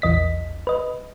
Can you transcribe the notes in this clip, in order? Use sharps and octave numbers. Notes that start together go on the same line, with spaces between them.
A#1 E2 D#5 B6
B4 D#5